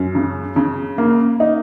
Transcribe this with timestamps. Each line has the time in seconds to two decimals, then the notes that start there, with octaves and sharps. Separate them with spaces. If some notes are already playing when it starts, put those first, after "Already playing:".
Already playing: F#2
0.15 C#3
0.56 C#3
0.98 A#3
1.40 D#4